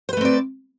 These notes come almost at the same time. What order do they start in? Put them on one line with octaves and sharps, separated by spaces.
C5 B4 A3 C4 D5